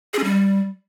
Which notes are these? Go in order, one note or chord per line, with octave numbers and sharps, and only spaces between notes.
G#4
C#4
G3